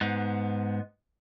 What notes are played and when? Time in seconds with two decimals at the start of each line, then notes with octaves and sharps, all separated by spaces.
0.01 G#2 B3